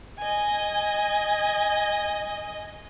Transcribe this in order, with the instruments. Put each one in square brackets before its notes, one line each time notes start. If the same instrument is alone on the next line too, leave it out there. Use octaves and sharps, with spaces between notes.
[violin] D#5 G#5